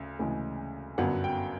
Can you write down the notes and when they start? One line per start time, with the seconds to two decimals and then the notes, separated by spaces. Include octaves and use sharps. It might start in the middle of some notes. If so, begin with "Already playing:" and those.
Already playing: D2 C#3
0.19 D2 C#3 E3 G#3
0.98 G1 F#2 D3 F#3 B3 F#5
1.24 G5